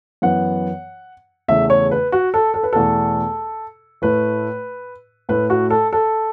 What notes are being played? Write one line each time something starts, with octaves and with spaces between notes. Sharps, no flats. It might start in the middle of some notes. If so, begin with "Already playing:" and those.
F#2 E3 B3 F#5
E2 C#3 A3 E5
C#5
B4
F#4
A4
A4
B4
E2 B2 A3 A4
A2 A3 B4
A2 A3 B4
F#4
A4
A4